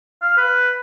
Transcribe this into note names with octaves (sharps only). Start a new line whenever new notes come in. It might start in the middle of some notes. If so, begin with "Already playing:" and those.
F5
B4